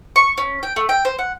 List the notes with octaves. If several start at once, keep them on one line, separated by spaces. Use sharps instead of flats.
C#6
C#4
G5
A3
G5
C5
F#5